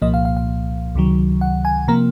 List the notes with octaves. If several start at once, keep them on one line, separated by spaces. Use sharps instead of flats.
C2 A#2 F3 A#3 D#5
F5
F5
F5
C#2 C3 D#3 F#3
F#5
G#5
C3 F3 A#3 A#5